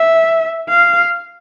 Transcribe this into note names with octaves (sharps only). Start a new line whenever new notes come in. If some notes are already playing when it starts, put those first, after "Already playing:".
Already playing: E5
F5